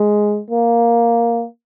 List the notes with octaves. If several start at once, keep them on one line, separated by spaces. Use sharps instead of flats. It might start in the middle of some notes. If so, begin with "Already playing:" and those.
Already playing: G#3
A#3